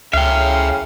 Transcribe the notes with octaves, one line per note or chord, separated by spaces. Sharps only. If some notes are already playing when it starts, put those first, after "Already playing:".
C#2 F#2 A2 C#3 E5 F5 G5